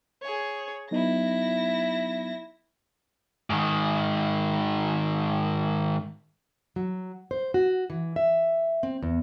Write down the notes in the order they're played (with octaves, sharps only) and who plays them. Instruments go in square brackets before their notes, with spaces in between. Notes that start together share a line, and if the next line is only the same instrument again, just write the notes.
[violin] G#4 C#5
[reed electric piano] F#3 B3 D#4 [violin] E4 A#6
[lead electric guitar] G#2 D#3
[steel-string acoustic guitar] F#3
C5
F#4
E3
E5
C4
E2